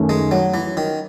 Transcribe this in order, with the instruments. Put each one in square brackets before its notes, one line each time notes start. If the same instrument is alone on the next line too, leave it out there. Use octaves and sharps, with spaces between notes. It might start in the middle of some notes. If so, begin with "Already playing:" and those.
Already playing: [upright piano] F#2 D#3 A3 C#4
[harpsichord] G#3
F#3
E3
D#3